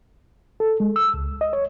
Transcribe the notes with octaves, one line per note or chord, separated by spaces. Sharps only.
A4
G#3
E6
C#2
D#5
C#5